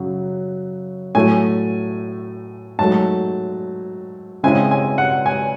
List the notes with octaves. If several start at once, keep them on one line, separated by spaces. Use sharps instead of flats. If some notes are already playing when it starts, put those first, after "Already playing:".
Already playing: F#2 C#3 F#3
A2 F#3 A3 G#5
G#2 F#3 A3 A5
C#3 G#3 C4 E4 G#5
G#5
F#5
G#5